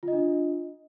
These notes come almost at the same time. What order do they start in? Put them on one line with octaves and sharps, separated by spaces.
F4 D#5 D4